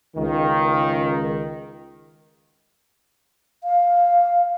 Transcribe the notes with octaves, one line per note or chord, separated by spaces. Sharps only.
C#2 D#3
F5